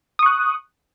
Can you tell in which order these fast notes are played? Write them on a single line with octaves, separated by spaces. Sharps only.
D#6 C#6 F#6